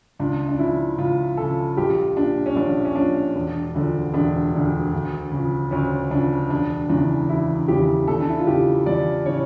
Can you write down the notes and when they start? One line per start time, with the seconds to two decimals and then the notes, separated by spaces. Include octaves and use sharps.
0.19 C#2 D4
0.48 D4
0.59 C#3 F3 E4
0.98 C#2 F4
1.37 C#3 F3 A4
1.77 A#1 G4
2.17 A#2 F3 D4
2.46 C#4
2.56 A#1 D4
2.85 C#4
2.95 A#2 F3 D4
3.35 E1
3.75 D2 D3 F3
4.14 E1 D4
4.54 D2 D3 F3
4.93 D2
5.32 C#3 F3
5.71 D2 C#4
6.11 C#3 F3 D4
6.50 E1 D4
6.89 E2 C#3 E3 D4
7.29 E1 E4
7.68 E2 C#3 E3 G4
8.08 E2 A4
8.20 D4
8.29 E4
8.39 F4
8.47 C#3 E3 G4
8.86 E2 D5
9.26 C#3 E3 C#5